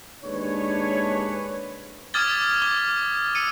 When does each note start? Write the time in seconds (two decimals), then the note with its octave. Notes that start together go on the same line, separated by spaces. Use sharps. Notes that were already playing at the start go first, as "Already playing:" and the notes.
0.24 D#2 G#3 D4 B4 C#5
2.14 D6 D#6 F6 G#6 A6 G7
2.61 D6 G7
3.35 E6 C#7 D#7